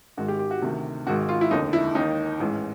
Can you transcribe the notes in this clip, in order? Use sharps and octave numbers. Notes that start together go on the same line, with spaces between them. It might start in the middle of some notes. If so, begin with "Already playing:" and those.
G#1 G#2 D#3 F#4
G4
G4
F#4
D2 C3 D#3
G#1 G#2 D#3 F#4
F4
E4
F1 D#2 D3 D#4
E4
D#2 D#3 D#4
A1 G#2 E3